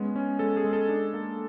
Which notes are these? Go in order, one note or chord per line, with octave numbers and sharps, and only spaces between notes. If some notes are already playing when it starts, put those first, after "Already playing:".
Already playing: G#3 B3 C#4
C#4
G#3 A4
G#4
G#3
A4
D4
A#3